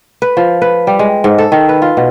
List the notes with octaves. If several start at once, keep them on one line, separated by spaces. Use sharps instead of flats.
B4
F3
B4
G3
G#3
G#2
A4
D#3
B4
F4
B2